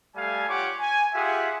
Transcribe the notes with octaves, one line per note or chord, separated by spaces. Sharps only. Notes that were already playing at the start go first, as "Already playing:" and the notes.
G3 A3 F5 G#5
F4 G4 C#5 F#5 D6
G#5
F4 G4 G#4 E5 F#5